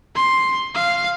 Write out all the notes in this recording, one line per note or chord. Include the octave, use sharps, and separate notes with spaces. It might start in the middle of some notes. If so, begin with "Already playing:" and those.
C6
F5